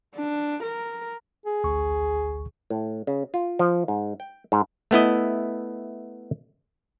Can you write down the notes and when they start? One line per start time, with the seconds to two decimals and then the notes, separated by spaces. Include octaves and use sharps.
0.15 D4
0.63 A#4
1.46 G#4
1.64 A1 D2 C#6
2.70 A2
3.07 C#3
3.34 F4
3.59 F3
3.88 G#2
4.20 G5
4.52 G#2
4.91 A3 B3 E4 D#5